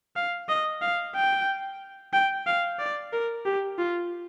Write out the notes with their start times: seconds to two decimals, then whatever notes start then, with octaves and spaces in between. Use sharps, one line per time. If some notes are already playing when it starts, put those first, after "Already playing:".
0.16 F5
0.49 D#5
0.81 F5
1.15 G5
2.13 G5
2.46 F5
2.79 D5
3.13 A#4
3.46 G4
3.78 F4